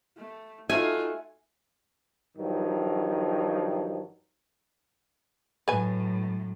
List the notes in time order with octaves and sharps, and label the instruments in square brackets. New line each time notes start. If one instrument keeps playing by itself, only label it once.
[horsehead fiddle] A3
[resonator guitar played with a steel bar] A3 F#4 A4 [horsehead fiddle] D#4 F4 [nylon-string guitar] E5 [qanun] G#5
[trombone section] G2 D#3 F3 F#3
[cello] F#2 A2 [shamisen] B4 G#5